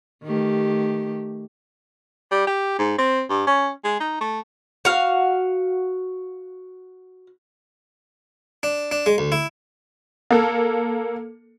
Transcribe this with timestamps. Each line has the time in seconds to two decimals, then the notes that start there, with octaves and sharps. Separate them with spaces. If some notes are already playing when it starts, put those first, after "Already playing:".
0.24 D#3 A3 G4
2.31 G3
2.47 G4
2.79 G#2
2.98 C4
3.29 G2
3.47 C#4
3.84 G#3
4.00 D#4
4.21 A3
4.85 F#4 F5
8.63 D4
8.91 D4
9.06 G#3
9.18 D2
9.32 E4
10.31 A#3 A4